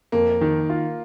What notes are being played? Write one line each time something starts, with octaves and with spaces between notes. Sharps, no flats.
F2 A#3
D#3
F4